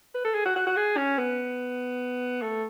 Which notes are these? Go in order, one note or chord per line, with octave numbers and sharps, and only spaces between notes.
B4
A4
G#4
F#4
F#4
F#4
G#4
C#4
B3
A3